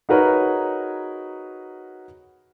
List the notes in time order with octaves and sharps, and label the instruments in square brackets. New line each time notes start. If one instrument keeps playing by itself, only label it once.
[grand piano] D#4 F#4 G#4 A#4 B4 C#5